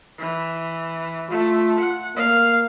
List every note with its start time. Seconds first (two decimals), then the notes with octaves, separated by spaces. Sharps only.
0.19 E3
1.30 A3 F4
1.80 F#5
2.17 A#3 F5